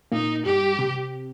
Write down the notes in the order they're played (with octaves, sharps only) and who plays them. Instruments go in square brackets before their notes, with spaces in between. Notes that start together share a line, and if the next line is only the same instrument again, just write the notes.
[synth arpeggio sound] A#2 A#3 [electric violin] D#4
[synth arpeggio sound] G2 G3 [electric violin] G4
[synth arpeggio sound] C3